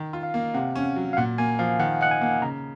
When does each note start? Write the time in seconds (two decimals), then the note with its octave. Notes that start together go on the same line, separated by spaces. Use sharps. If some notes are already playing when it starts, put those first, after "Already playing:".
Already playing: D#3
0.13 F4
0.23 F5
0.34 A#3
0.54 C3 F#5
0.76 C#4
0.96 F#3
1.13 F5
1.17 A#2 F#5
1.38 A#3 G#5
1.59 F3 F5
1.79 D#3 F#5
2.01 D#4 F#5
2.11 G#5
2.21 A#3
2.42 C#3 A#5